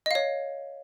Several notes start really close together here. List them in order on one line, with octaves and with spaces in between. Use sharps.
D#5 F5 C#5